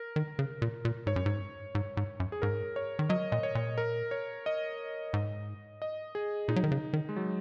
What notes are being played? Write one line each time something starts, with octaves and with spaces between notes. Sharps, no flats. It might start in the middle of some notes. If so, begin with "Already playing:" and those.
Already playing: A#4
D#3
C#3
A#2
A#2
G#2 C#5
F#2
G#2
G#2
G#2
F#2
G#4
G#2 A#4
C#5
D#3
F#3 D#5
A#2 D#5
C#5
A#2
A#4
C#5
D#5
G#2
D#5
G#4
A#2 D#4
F#3
D#3
C#3
D#3
G#3
F#3